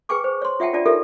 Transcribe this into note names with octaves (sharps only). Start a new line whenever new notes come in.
G#4 B4 G5 G#5 C#6 D6
C5
C#5 C6
F4 E5 F#5 G5 A5
D4 F4 D5 A5
D#4 F4 G4 A4 A#4 E5